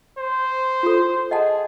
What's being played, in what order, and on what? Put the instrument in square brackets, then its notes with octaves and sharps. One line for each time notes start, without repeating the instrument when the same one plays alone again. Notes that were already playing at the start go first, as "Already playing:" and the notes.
[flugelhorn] C5
[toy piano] F4 A4
[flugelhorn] G#4 [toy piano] D#5 F#5 A5